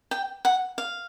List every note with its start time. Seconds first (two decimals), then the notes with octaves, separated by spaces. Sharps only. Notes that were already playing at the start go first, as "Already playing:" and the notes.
0.11 G5
0.45 F#5
0.78 F5